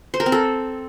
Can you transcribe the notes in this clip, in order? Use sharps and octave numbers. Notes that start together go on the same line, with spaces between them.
C5
A#4
C4
A4